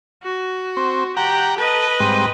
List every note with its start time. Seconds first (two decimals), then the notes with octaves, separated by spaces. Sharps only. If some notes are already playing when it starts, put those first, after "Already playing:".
0.23 F#4
0.77 C4
1.17 G4 F#5 G5 A#5
1.58 A4 B4 D#5
2.00 G#2 G3 C4